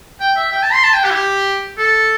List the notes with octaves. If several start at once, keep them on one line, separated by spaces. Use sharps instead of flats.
G5
E5
G5
A5
C6
A5
G5
G4
E4
G4
A4